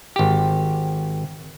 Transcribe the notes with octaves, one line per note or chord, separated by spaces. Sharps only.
G#1 G4